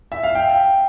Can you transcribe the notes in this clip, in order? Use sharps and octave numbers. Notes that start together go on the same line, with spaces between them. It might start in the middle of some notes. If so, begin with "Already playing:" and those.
E5
F5
G5